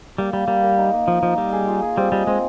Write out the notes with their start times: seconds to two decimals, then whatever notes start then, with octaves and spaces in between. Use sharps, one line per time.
0.18 G3 A#3
0.33 G3 A#3
0.47 G3 A#3
0.63 A#4
0.78 D#4
0.93 A#3
1.08 F3 D#4
1.23 F3 D#4
1.38 G3 D#5
1.53 G#4
1.67 F4
1.82 G#4
1.97 G3 C4
2.12 G3 D#5
2.27 G#3 C4